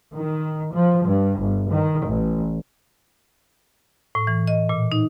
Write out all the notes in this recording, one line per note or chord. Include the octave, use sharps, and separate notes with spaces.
D#3
F3
G2
G1
D#3
A1
A2
E3
D#5
A#2
D#4